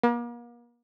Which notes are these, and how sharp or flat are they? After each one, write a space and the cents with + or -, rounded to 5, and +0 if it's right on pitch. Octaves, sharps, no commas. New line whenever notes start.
A#3 +40